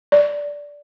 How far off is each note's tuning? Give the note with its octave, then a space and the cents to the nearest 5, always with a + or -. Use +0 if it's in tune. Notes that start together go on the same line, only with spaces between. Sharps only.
D5 -10